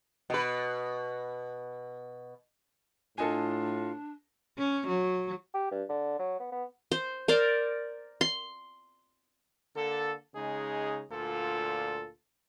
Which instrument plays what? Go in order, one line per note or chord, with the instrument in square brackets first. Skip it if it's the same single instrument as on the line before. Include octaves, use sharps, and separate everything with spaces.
[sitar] B2 B4
[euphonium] A2 [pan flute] D4 [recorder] F4 [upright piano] A4 D#5 G#5
[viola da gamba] C#4
F#3
[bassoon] G4
G2
D3
F#3
B3
B3
[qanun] C5
A#4 C5 D5
C6
[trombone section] D3 A#3 A4
C#3 G#3 D#4 G#4
D2 A#2 F4 A4